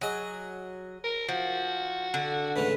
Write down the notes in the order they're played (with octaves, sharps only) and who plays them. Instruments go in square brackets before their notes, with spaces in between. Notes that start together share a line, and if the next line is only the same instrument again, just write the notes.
[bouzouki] F#3 [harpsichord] G#4 D#5
[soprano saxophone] A#4
[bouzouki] F3 [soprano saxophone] F#4
[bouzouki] D3
[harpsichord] C#2 A2 E3 [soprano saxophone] B4